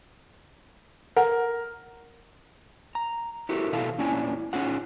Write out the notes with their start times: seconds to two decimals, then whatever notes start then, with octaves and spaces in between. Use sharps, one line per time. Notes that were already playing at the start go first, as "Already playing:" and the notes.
1.16 A#4 F#5
2.95 A#5
3.49 E4 F#4 G4 A4 A#4
3.72 B2 E3 A4 F5 A5
3.98 E2 A#2 C#4 D4 E4 G#5
4.53 C#4 D#4 F4 G#4 F#5